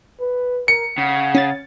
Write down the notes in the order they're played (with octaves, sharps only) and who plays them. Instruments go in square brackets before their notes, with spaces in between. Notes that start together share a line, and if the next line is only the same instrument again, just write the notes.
[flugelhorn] B4
[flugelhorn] A#4 [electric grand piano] C#7
[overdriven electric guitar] C#3 [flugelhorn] F#5
[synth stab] C#4 A6